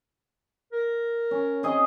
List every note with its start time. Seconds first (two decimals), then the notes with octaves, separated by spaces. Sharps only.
0.72 A#4
1.31 C#4
1.63 C4 G#4 D#5